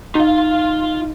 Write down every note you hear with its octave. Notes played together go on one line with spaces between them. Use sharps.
D#4 F4 F5